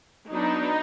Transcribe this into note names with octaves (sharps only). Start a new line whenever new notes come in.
F#3 B3 D4 D#4